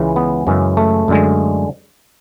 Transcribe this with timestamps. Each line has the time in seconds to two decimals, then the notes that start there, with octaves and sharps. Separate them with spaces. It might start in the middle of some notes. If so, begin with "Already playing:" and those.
Already playing: C#2 C#3 E3 G#3
0.16 B3
0.47 F#2 C#3 E3 G#3
0.77 A3
1.08 F#2 D3 G#3